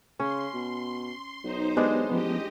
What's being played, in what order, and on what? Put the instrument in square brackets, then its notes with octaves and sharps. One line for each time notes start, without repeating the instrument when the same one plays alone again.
[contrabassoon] C#3 [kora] C#4 [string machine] C6
[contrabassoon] B2
[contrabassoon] B1 [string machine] D#4 C5
[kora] G#3 D4 [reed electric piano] B3 G4
[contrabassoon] A1 [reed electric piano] F3 B3 [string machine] G4 D#5